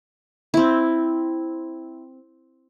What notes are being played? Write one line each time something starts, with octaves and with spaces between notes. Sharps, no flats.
C4 E4